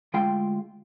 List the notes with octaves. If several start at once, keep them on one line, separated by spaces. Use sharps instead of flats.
D2 G#3 F4 F5 G5